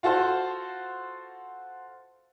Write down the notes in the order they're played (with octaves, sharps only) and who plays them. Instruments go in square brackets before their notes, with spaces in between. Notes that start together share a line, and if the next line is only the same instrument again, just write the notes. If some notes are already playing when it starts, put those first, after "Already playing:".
[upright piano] F4 F#4 A4 C5